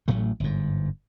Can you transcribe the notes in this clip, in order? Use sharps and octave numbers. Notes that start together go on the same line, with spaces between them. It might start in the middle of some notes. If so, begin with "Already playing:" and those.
A1 A2 F#3 A3
G1 G#2